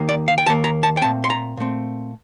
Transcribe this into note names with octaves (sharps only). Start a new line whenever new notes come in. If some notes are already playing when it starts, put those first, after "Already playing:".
Already playing: D#2 D#3 A#3
D5
F5
G5
D#2 D#3 A#3 A5
A#5
A5
G5
A#2 A3 C4 A5
C6
A#5
A#2 A3 C4